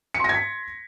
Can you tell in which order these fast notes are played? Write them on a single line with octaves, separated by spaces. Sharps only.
C#7 C6 A#6 G#6 B6